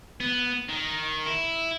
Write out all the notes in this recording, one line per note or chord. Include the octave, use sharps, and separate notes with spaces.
B3
D#3
E4